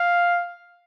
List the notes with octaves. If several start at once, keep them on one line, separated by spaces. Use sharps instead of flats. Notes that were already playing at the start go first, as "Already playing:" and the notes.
Already playing: F5